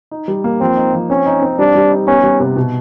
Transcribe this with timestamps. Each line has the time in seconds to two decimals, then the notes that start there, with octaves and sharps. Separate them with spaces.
0.11 D#4
0.28 G3
0.44 A#3
0.61 F3 C4
0.77 D#4
0.93 F3
1.10 C4 C#4
1.26 D#4
1.42 C4
1.59 G3 D4
1.75 G3
1.92 D#4
2.07 B3 C#4
2.23 G3
2.40 C3
2.56 B2